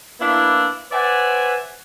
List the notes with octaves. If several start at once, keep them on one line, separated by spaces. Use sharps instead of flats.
A#3 B3 D4 E4
B4 C5 D5 E5 F#5 G#5